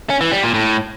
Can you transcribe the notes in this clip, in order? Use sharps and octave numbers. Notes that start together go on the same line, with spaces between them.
C#4
E3
G3
A#2
A2